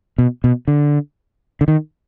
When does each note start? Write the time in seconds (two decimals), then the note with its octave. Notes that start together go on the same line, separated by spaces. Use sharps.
0.18 B2
0.44 B2
0.68 D3
1.61 D3
1.68 D#3